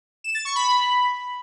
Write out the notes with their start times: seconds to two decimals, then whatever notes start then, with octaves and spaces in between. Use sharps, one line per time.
0.24 E7
0.35 A6
0.45 C#6
0.56 B5